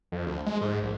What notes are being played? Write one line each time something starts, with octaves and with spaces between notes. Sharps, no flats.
F2
D2
G#3
G#2
A#1